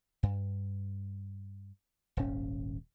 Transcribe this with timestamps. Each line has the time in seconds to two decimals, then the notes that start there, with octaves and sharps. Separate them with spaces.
0.23 G2
2.17 D#1 G#1 C#4